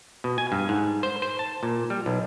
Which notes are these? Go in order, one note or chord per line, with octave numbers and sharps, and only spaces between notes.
B2
G#5
G2
G#2
C5
C5
A5
A#2
G3
B1